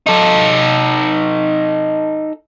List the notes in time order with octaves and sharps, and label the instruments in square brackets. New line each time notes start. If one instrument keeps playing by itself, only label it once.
[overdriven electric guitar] D#4 A4